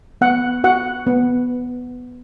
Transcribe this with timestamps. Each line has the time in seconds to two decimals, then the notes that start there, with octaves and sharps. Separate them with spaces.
0.21 B3 F#5
0.64 F#4 F#5
1.07 B3